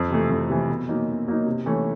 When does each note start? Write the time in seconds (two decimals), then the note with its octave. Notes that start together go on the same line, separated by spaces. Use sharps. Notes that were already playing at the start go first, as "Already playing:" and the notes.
Already playing: F2
0.11 C3 E3 A3
0.30 F2
0.50 C3 E3 A3
0.69 B2
0.89 F#3 A#3 D#4
1.08 B2
1.27 F#3 A#3 D#4
1.46 C3
1.66 E3 A3 C#4